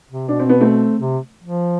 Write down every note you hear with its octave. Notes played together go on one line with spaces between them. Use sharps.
C3
B2 D4
C4
B3
A3 C4
C3
F3